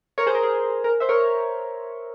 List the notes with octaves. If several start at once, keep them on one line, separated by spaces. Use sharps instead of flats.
A#4 C#5
G#4 C5
A#4
G#4
A#4
C5 E5
A#4 C#5